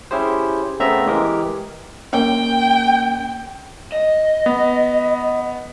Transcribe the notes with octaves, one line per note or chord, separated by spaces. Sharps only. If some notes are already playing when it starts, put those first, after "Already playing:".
C#4 E4 G4 G#4 C5
C#3 A3 B3 C4 E5 A#5
E3 G#3 G4 G#4 A#4
A#3 C#4 G5
D#5
B3